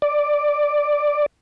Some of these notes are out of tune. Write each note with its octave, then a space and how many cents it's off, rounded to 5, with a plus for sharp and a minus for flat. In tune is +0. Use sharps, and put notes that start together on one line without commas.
D5 +5